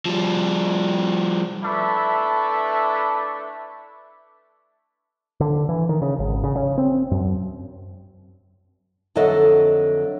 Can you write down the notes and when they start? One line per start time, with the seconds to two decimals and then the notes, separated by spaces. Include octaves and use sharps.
0.06 F3 G3
1.63 A3 D4 E4 B4 E5
5.40 D3
5.69 E3
5.89 D#3
6.02 C#3
6.19 G#1
6.44 C#3
6.55 C#3
6.78 C4
7.11 F#2
9.15 F2 D3 F#3 A4 D#5 E5